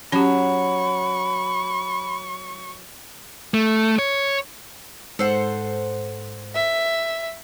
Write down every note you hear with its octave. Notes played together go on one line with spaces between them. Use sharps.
F#3 C#4 G4 B5 C#6
A3
C#5
G#2 A4 C5 F#5
E5